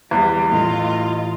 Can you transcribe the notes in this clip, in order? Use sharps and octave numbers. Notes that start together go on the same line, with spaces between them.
E2 G3
A2 E3 A3 F4 D#5